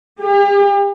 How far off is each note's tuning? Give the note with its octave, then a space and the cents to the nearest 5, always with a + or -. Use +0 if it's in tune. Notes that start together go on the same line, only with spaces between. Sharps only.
G4 +45